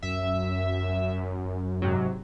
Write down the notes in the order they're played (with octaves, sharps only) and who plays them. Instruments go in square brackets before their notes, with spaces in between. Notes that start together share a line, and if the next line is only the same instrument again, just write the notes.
[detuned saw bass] F#2 [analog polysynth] E5
[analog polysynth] G#2 C3 F#3